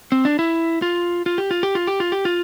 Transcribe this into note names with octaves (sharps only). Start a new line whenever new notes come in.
C4
D4
E4
F4
F4
G4
F4
G4
F4
G4
F4
G4
F4